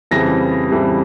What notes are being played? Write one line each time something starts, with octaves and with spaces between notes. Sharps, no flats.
F2 C#3 E3 G3 A#6
F2 C#3 E3 G3